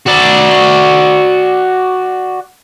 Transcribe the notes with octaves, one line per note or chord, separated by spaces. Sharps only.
F#4 D5